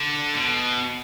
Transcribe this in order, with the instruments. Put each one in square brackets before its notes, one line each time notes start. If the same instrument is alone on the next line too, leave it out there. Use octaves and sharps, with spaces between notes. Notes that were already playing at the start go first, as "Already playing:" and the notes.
Already playing: [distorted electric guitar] D3
B2